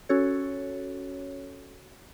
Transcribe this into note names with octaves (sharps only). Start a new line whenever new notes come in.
C#4 F#4 A4 C#5